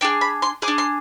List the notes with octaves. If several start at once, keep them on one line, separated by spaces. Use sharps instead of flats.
D4 G#4 G5
B5
C6
G#4 D6
D4
C6